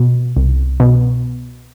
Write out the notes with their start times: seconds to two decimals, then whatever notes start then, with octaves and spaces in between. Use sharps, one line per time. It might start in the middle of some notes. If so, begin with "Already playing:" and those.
Already playing: B2
0.37 C2
0.80 B2